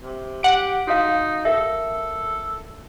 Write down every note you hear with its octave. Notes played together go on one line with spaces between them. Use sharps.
C3
G4 F#5 D7
D#4 F#4 F5
A4 A#4 E5